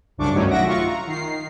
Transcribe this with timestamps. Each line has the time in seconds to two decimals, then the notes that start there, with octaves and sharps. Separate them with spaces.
0.17 C2 F#2 C#3 D4 C#6 D6
0.33 G2 D#3 F#3 A3 C#4
0.50 B1 F#4 E5 F#5 A#6 D7
0.66 F4 C#6
0.86 A#5
1.07 D#3 C7